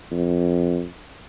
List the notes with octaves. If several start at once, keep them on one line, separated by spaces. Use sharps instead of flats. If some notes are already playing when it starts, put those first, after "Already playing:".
F2